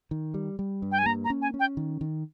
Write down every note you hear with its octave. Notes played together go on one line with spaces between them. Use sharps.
D#3
G3
G3
G2
G5
G#5
A#3 A#5
A#5
C#4
G#5
C#4
G5
D#3
D#3